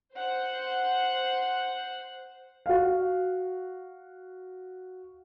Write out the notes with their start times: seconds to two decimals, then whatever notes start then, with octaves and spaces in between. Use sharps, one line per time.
0.14 C5 F#5
2.66 F#4 F5